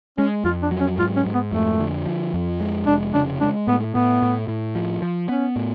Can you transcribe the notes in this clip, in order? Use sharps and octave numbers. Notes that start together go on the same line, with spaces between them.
G#3 C#4
F2 F4
D4
F#3
C#4
G#2 F4
C#4
G#2
B3
F2 A3
D3
F3
F2
G#3
F1 D4
C#3 D4
G#3 D4
A2 B3
A2 B3
A2
A2
F3
F3
B3 C#4
A2